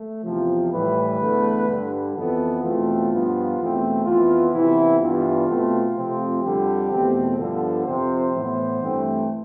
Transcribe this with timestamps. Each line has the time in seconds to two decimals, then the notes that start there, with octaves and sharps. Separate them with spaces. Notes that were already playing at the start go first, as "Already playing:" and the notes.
Already playing: A3
0.25 E2 C3 F3
0.72 A2 E3 G3 B4
1.20 E2 D3 A3
1.68 G2 D3 G3
2.15 F2 E3 B3 A4
2.62 E2 B2 A3 C4 F4
3.10 G2 F3 B3
3.58 E2 B2 A3 C4
4.05 F2 E3 B3 F4
4.52 C3 E3 B3 E4
5.00 G2 E3 G3 B3 F4
5.47 B2 A3 C4
5.95 C3 F3 A3 C4
6.42 F2 D3 G3 G4
6.90 E2 B2 A3 C4
7.38 G2 D3 F3 B3 A4
7.85 F2 C3 F3 C4 C5
8.32 A2 E3 B3
8.80 G2 E3 A3 C4